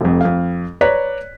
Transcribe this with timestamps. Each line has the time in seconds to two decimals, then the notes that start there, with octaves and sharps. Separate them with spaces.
0.01 F1 F2
0.21 F2 F5
0.81 B4 C#5 D5 A#5 F#6 B6